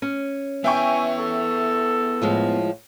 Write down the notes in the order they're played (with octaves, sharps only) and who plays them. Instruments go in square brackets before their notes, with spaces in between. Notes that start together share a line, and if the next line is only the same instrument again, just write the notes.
[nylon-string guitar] C#4
[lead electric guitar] B3 E4 [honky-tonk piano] E5 G5 C#6 [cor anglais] G#5
[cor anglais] A4
[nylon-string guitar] A2 F3 G#3